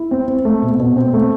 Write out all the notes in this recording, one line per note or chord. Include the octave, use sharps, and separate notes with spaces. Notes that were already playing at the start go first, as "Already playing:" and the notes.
Already playing: E4
C4
C4
A3
B2
B2
C4
A3